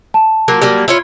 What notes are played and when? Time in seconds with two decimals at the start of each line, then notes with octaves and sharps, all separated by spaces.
0.14 A5
0.48 F#3 A#3 F4
0.62 F#3 G3 A#3
0.88 E4 F4 C#5